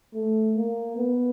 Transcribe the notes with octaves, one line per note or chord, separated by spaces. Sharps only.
A3
A#3
B3